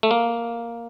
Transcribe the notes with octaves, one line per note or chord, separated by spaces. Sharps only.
A3
A#3